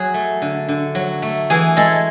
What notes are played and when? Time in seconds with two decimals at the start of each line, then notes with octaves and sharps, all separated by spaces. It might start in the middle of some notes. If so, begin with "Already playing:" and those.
Already playing: F#3 G#4
0.14 A3
0.42 D3
0.68 D3
0.95 F#3
1.22 A3
1.50 E3 G#4
1.76 G#3 A4